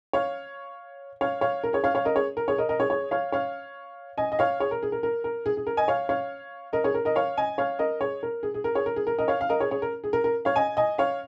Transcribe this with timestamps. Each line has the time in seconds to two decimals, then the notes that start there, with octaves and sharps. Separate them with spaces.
0.13 C#5 F5
1.21 C#5 F5
1.41 C#5 F5
1.64 A#4
1.73 G#4 C#5
1.84 C#5 F5
1.95 C#5 F5
2.05 A#4 D#5
2.16 G#4 C#5
2.37 A#4
2.48 G#4 C#5
2.58 A#4 D#5
2.69 A#4 D#5
2.80 G#4 C#5
2.90 G#4 C#5
3.11 C#5 F5
3.32 C#5 F5
4.18 D#5 G#5
4.32 D#5
4.39 C#5 F5
4.60 G#4 C#5
4.71 A#4
4.83 G#4
4.92 A#4
5.03 A#4
5.24 A#4
5.46 G#4
5.57 G#4
5.67 A#4
5.77 D#5 G#5
5.88 C#5 F5
6.09 C#5 F5
6.73 A#4 D#5
6.84 G#4 C#5
6.94 A#4
7.05 A#4 D#5
7.16 C#5 F5
7.38 D#5 G#5
7.58 C#5 F5
7.79 A#4 D#5
8.01 G#4 C#5
8.23 A#4
8.43 G#4
8.54 G#4
8.64 A#4
8.75 G#4 C#5
8.86 A#4
8.96 G#4
9.07 A#4
9.19 A#4 D#5
9.28 C#5 F5
9.41 F5
9.49 A#4 D#5
9.60 G#4 C#5
9.71 G#4 C#5
9.82 A#4
10.04 G#4
10.13 A#4
10.24 A#4
10.45 C#5 F5
10.56 D#5 G#5
10.77 D#5 G#5
10.98 C#5 F5